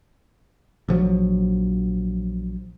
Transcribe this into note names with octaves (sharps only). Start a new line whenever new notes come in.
A#1 F3 F#3